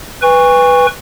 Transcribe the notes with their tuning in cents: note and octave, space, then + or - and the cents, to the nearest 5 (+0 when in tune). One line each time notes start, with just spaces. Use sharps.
B4 +0 G#5 -40 C#6 +0